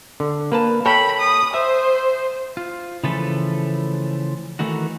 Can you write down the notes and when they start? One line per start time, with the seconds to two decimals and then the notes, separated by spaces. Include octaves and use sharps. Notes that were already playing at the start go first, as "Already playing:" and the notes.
0.20 D3
0.52 A#3 B4 A5
0.86 A4 C#5 G5 B5
1.20 D#6
1.54 C5 E5
2.57 F4
3.03 C#3 E3 F3 A3 A4 B4
4.59 D#3 E3 A3 D#4 F#4